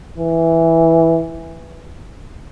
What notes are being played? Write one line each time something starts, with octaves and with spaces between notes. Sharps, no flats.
E3